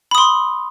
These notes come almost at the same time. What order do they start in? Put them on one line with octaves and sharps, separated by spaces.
B5 D#6 C6